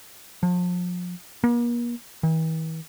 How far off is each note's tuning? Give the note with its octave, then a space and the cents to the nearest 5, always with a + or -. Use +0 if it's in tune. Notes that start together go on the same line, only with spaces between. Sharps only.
F3 +35
A#3 +40
E3 -45